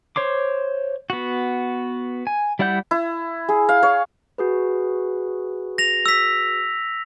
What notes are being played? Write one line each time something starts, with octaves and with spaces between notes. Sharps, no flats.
C5 C#5 C6 D6
B3 F#4
G#5
G3 E4 D5 F#5 G6
E4
G#4
F5
C#5
F#4 G#4 B4
A#6 F7
E6 B6